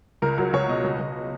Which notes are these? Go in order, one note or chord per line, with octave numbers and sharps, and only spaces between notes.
C#2 A#4
F#3 A#4
C#2 C#5
B2 D#5
C#2
C#2